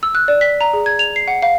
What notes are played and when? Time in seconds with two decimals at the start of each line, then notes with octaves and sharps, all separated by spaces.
0.03 E6
0.15 F#6
0.28 D5
0.41 B6
0.61 A#5
0.73 G#4
0.86 G#6
0.99 F7
1.16 C7
1.28 F#5
1.42 F5